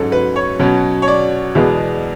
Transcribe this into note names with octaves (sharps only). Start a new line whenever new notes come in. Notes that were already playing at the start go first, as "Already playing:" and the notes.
Already playing: G#2 F#3 C#4 A4
B4
C#5
B2 F#3 C#4
C#5
D5
E2 B2 G#3 B3